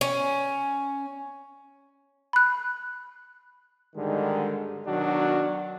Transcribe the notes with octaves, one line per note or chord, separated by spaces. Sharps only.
C#4
B5 F#6
G#2 D3 D#3 G3 G#3
B2 D#3 F#3 D4 F#4